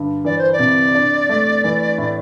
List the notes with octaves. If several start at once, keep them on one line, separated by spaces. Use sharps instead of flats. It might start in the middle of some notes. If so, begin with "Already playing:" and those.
Already playing: G2 D3
E3 D5
C5
D5
C3
D4
A3
E3
A2